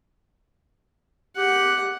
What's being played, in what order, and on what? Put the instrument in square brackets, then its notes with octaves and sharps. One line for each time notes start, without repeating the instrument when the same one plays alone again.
[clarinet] G4 [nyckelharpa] F#5